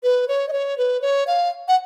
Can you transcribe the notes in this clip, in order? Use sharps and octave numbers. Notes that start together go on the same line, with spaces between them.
B4
C#5
D#5
C#5
B4
C#5
F5
F#5